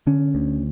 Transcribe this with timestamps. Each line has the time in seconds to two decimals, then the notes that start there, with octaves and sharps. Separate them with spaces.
0.07 D3 C#4
0.35 D2